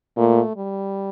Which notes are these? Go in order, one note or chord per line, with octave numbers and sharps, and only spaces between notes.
A#2 A3
G3